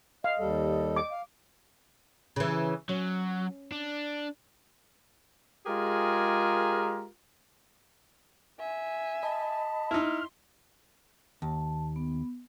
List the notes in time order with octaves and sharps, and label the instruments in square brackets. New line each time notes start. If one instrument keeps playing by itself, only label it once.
[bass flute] D#5 [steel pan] F5
[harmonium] D#2 G3 A4
[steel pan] D6
[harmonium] F5
[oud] C#3 E3
[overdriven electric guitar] F#3 [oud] C#4
[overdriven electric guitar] D4
[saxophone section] G#3 F4 G4 G#4 A#4
[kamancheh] E5 G#5
[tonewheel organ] D#5 B5 [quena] A5
[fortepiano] D#4 E4 [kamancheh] C6 [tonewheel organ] F6
[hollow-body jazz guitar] D#2 [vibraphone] A5
[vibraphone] B3